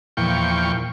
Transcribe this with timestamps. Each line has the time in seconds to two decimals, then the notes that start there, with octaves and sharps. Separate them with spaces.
0.17 E2 A#2 F3 G5 C#6